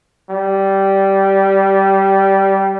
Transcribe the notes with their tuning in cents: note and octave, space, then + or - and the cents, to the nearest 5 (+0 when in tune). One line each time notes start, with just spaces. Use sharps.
G3 -10